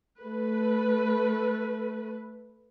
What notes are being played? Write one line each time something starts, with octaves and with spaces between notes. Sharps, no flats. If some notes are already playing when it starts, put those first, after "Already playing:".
A3 B4